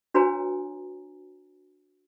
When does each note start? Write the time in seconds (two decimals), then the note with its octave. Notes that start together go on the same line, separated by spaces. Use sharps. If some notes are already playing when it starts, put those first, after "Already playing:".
0.14 D4 F#4 B4 C#5 G#5 A#5